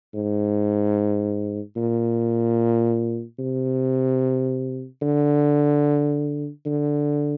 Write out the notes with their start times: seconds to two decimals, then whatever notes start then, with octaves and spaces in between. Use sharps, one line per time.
0.14 G#2
1.76 A#2
3.39 C3
5.02 D3
6.65 D3